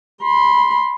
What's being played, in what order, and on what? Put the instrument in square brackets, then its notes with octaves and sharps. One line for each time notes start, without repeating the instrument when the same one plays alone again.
[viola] B5 C6